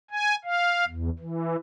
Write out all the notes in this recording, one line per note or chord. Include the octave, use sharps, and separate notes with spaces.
G#5
F5
E2
E3